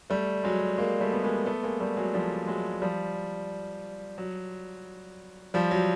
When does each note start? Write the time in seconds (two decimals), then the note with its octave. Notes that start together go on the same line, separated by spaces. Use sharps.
0.10 G3 A3
0.44 F#3 G#3
0.78 G#3 A#3
1.00 G3 A3
1.13 B3
1.23 G#3 A#3
1.45 A3 B3
1.63 G#3 A#3
1.80 G3 A3
1.97 F#3 G#3
2.13 F3 G3
2.47 F#3 G#3
2.82 F3 G3
4.18 F#3
5.54 F3 G3
5.71 F#3